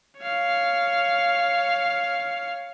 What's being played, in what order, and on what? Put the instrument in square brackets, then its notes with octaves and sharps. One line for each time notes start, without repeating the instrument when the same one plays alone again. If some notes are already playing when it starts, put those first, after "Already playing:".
[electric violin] C#5 F5